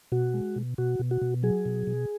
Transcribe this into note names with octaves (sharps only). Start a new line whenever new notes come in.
B2 F#4
G#3
B2
B2 F#4
B2
F#4
B2
F#3 G#4
B2
B2